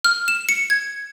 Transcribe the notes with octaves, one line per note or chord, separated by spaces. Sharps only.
F6
E7
C#7
G#6